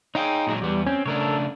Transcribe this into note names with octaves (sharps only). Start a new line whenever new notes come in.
D#4 G#4 C#5 F5 G5
A#2 F#3 G#3
E2 G3 B3
C4 C#4
C#3 A3 D4 A4 A#4 C#5